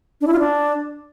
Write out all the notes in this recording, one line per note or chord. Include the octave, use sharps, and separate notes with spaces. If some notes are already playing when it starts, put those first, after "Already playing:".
D4
E4
F4
D4